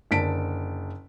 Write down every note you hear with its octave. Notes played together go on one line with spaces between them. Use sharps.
F#1 D3 A5 B6 D7